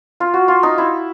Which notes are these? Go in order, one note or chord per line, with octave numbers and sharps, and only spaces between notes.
F4
F#4
F4
D#4
E4